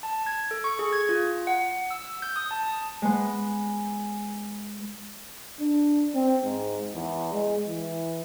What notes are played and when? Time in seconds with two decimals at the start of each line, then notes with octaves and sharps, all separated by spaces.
0.03 A5
0.26 G#6
0.51 A4
0.64 C#6
0.79 G#4
0.93 G#6
1.09 F4
1.47 F#5
1.91 E6
2.22 G6
2.36 D#6
2.51 A5
3.02 G#3 B3
5.59 D4
6.15 C4
6.45 G#2
6.94 E2
7.33 G#3
7.68 E3